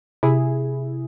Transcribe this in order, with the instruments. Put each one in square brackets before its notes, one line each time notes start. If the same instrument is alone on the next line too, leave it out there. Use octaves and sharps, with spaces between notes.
[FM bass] C3 [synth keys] E4 G#4